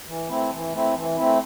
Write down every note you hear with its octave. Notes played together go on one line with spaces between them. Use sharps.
E3
A3 C4 E4
E3
A3 C4 E4
E3
A3 C4 E4